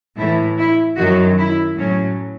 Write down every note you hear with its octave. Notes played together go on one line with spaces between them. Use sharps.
A2 E3 E4
E4
F#2 D#3 F#3 F#4
E4
A2 F#3 C#4